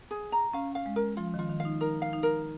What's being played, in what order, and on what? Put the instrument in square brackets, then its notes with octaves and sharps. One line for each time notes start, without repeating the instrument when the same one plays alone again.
[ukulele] G#4
A#5
[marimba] C#4 [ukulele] F5
[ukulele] F5
[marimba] G#3
[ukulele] A#4
[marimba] F3 [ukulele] F4
[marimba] D#3 [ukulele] F4
[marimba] D#3
[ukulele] F5
[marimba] D#4
[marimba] D#4 [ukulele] A#4
[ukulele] F5
[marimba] D#4
[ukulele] A#4